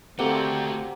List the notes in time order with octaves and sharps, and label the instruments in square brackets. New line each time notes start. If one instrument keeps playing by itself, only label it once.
[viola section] D3 G5 [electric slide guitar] A3 F#4 [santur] A#3 G4 F#5 [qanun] C4